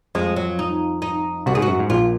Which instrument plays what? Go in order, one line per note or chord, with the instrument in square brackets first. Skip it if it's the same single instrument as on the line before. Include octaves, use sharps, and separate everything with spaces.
[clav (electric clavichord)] F2 F3 [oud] G#3
[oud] F#3
D#4
D#4
[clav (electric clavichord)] C2 C3 [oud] F#4
[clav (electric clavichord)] G#2 [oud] G#4
[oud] F#4
[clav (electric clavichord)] F#2
G#2
[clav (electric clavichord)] A#1 A#2 [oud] F4